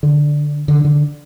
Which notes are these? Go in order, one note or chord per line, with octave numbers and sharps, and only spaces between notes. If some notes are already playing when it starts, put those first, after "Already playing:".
D3
D3
D3